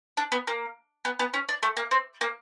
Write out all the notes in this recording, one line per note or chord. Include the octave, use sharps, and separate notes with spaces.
D4
B3
A#3
B3
B3
C#4
D4
A3
A#3
C4
A#3